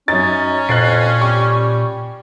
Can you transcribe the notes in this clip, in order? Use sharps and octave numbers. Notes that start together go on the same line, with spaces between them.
F#2 C#4 D#4 A6
F2 A#2 F#6 A6 C7
G3 C#6